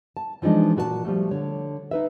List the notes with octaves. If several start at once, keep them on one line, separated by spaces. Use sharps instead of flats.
A5
E3 F3 G#3 D4 D#4
A#2 F#4 B4 A5
F3 G3 A3
D3 C#5
D#4 B4 E5